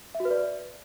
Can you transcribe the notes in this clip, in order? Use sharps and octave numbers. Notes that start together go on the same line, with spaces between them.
E5
F#4
B4
D5